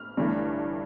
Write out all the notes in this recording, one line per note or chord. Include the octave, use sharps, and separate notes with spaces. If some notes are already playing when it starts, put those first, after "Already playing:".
Already playing: F6
G1 G2 E3 A3